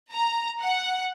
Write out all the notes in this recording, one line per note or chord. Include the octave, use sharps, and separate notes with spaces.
A#5
F#5